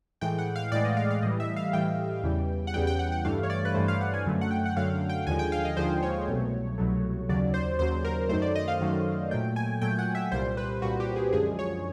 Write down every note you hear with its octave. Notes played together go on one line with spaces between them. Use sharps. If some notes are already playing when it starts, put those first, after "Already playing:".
A2 E3 G#3 G5
F#5
F5
A2 E3 G#3 D5
D#5
F5
F5
A2 E3 G3 D#5
E5
F5
A2 E3 G3 G5
E2 C#3 E3 G3
F#5
E2 C#3 E3 G3 G5
G5
F#5
F#5
G2 E3 A3 F5
C#5
D5
B4
G2 E3 A3 C5
F5
F#5
G#5
F#2 D3 F#3 A3
F#5
G5
F#5
F#2 D3 F#3 A3 F5
G5
D#2 D3 F3 G#3 G#5
G5
F5
D#5
D#2 D3 F3 G#3 C5
C#5
C2 B2 F#3 A3
C2 B2 F#3 A3
D#2 C#3 F#3 D5
C5
D#2 C#3 F#3 C5
A#4
F#2 D#3 F#3 A3 C5
D5
D#5
F5
F#2 D#3 F#3 A3
A#2 F#3 A3 G5
G#5
A#2 F#3 A3 G5
F#5
E5
C2 A#2 G3 C5
B4
C2 A#2 G3 F#4
G4
G#4
F#2 D3 F3 G#3 G#4
C#5